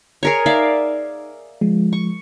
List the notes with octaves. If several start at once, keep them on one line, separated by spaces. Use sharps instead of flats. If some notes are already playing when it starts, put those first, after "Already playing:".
G#4 A#4 C#5
D#4 D5 E5 F5
F3 G#3
C#6